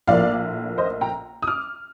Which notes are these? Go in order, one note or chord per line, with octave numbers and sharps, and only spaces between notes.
A#1 A2 F3 A#3 D5 F5
C5 D#5
G5 A#5
D#6
D6 F6